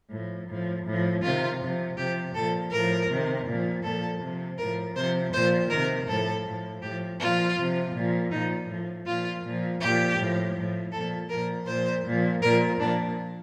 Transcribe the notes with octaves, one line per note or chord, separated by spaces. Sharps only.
A2 F3
A2 F3
A2 F3
C3 D#3 F4
C3 F3
C3 F3 G4
A#2 F3 A4
A2 F3 A#4
C3 D#3
A#2 F3
A#2 F3 A4
C3 F3
A2 F3 A#4
C3 F3 C5
A#2 F3 C5
C3 D#3 A#4
A2 F3 A4
A2 F3
A2 F3 G4
A#2 F3 F4
C3 F3
A#2 F3
A#2 F3 D#4
A2 F3
A#2 F3 F4
A#2 F3
A#2 F3 G4
A2 F3
A2 F3
A#2 F3 A4
A#2 F3 A#4
A#2 F3 C5
A#2 F3
A#2 F3 A#4
A#2 F3 D4